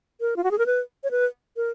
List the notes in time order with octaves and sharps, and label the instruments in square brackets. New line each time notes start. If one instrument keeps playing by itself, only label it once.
[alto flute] A#4
F4
F#4
G#4
A#4
B4
C#5
B4
A#4